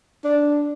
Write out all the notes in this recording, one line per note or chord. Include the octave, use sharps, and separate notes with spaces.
D4